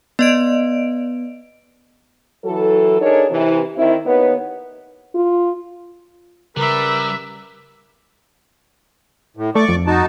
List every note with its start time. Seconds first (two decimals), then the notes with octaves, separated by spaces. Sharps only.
0.19 B3 D5 D#5 D7
2.45 E3 F#3 A4
3.01 D4 D#4 G#4 A#4 C#5
3.30 C3 E3
3.77 D#3 C4 E4
4.06 D#2 B3 D#4 B4 C#5
5.14 F4
6.57 C#3 G3 A#4 B4 E5
9.37 A2
9.55 A3 D5 C#6 D6
9.69 F2
9.87 D#4 F#4 A5